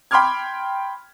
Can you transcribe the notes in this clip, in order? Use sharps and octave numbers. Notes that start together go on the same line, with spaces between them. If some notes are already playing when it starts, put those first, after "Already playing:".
G5 B5 C6 D6 F6 G#6